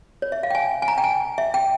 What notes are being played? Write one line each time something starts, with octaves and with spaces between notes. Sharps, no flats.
C#5
E5
F5
G5
G#5
G#5
A#5
G5
G#5
E5
G5